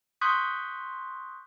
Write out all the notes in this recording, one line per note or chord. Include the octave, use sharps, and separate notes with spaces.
C6 C#6 D#6 F#6 G6 B6